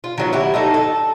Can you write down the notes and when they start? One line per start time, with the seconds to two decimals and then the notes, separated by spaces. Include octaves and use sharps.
0.04 F4
0.18 D#3 F#3 B3
0.33 E4 F#4 G4
0.54 A3 D#4 A4
0.74 A4